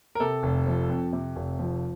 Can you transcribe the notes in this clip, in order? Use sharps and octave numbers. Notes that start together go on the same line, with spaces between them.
A#4
C3 A4
F1
F3
F2
C3
F1
F3